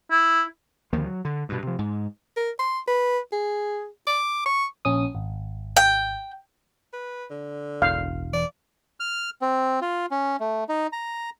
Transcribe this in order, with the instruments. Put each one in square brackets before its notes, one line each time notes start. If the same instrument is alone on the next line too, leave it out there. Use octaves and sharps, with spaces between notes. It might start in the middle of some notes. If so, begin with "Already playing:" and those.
[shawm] E4
[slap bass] D2 D#3 F3 A#3
F#3
D3
G2 B2
C3 F3
G#2
[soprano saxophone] A#4
C6
B4
G#4
D6
C#6
[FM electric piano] A#1 C#4 D#6
G#1
[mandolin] G5
[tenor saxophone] B4
D3
[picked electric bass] E1 [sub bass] A1 [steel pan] F5
[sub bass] E3 [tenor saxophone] D5
[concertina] F6
C4
F4
C#4
A3
D#4
A#5